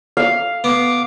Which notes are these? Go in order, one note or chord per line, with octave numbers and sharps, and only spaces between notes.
F5
B3 D6